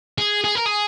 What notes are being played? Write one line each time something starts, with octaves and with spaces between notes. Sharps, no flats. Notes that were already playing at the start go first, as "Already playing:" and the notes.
G#4
G#4
A#4
G#4